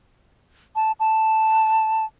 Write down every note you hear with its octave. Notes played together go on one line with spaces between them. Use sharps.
A5
A5